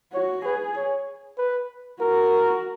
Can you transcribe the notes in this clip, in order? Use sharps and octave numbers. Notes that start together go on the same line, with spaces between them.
F#4 C#5
G#4 B4
C#5
B4
F#4 A#4